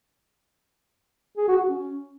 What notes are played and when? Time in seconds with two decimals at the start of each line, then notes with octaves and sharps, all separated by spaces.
1.37 G#4
1.48 F#4
1.58 F#4
1.69 C#4